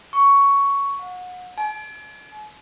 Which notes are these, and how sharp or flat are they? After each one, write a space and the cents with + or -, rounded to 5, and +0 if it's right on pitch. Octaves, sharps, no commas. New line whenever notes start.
C#6 +10
F#5 -30
G#5 +45